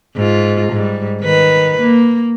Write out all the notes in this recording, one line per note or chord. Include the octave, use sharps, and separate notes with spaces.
G#2 F4
G#2 G3
D#3 B4
A#3